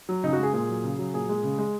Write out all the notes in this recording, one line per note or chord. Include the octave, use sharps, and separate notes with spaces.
F#3
C#3 D#4
F#4
G#3
G#4
A#2 G#4
F#3
C#3
F#3
A#2 G#4
G#3
C#3
G#3